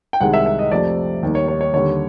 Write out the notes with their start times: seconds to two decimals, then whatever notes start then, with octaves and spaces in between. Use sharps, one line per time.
0.13 G5
0.21 C2 C3 D#3 G#3 F#5
0.34 E5
0.46 E5
0.59 D#5
0.72 F2 C3 F3 A3 D5
1.23 D#2 D#3 G3
1.35 C#5
1.48 C#5
1.61 C#5
1.73 D#2 D3 G3 C#5